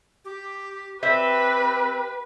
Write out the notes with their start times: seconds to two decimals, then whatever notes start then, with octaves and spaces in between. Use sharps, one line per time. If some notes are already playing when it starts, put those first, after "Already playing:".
0.25 G4
1.03 C4 G4 B4 C5 E5